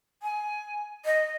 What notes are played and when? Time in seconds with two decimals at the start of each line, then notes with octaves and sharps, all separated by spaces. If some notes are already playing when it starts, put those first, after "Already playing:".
0.23 G#5
1.05 D#5